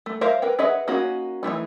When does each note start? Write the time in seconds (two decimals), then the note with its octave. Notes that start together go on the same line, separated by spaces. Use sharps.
0.06 A3
0.21 A#4 C5 E5 F5
0.42 A#4 B4 G5
0.59 G#4 B4 D#5 E5 F#5
0.88 A#3 C#4 D#4 F#4
1.43 E3 F3 A3 D#4